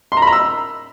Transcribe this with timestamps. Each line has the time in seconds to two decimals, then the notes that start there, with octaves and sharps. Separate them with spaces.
0.12 C6
0.17 A#5
0.22 B5
0.27 A#5
0.33 E6